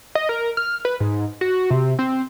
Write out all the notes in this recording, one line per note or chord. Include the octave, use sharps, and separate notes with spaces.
D#5
A#4
F6
B4
G#2
F#4
C3
C4